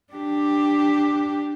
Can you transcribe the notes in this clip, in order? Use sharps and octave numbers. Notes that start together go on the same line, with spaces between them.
D4 G4